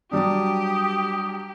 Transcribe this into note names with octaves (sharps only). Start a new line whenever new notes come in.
F#3 G3 D4 G4 D#6